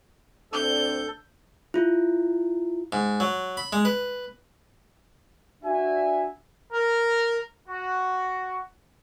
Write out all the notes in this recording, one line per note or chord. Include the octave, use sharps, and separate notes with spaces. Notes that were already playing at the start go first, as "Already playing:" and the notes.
D2 C4 D4 A4 G6
E4 F4
G#2
F#3
B5
G#3
B4
D4 F#4 E5 G#5
A#4
F#4